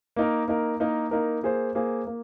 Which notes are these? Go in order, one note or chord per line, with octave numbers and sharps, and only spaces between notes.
A#3 D#4 A#4
A#3 D#4 A#4
A#3 D#4 A#4
A#3 D#4 A#4
A#3 G#4 C5
A#3 G#4 C5
A#3